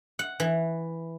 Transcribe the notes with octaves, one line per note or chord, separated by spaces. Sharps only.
F#5
E3